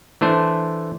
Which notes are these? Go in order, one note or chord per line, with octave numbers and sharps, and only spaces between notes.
E3 A3 D4 C5